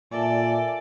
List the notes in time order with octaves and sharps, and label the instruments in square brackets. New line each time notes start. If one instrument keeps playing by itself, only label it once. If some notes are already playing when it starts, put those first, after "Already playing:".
[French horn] A#2 [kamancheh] A4 D5 [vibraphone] A#4 E5 G#5